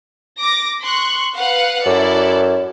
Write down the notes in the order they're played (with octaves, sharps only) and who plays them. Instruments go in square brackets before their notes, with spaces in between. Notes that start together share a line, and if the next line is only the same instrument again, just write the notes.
[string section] D6 A#6
C6 C#6 F#6
B4 F5 F#5
[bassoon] F#2 [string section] E4 A4 D5